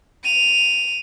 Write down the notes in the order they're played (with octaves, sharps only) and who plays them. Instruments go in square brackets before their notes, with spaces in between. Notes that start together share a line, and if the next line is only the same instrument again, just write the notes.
[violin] D#7 F7